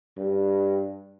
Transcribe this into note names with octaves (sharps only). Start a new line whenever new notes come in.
G2